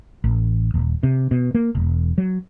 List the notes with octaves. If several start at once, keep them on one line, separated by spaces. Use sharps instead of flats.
A1
D#1
C3
B2
A#3
E1
F#3